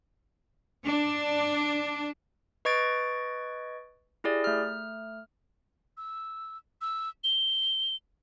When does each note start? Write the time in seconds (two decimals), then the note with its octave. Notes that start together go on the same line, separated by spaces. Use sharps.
0.88 D4
2.65 B4 D#5 C#6 G#6 A6 D7
4.24 E4 G4 G#4 D5
4.44 A3 F6
5.97 E6
6.81 E6
7.24 G7